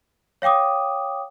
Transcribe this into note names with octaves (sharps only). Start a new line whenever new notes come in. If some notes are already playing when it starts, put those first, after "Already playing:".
C#5 F5 G5 D6 D#6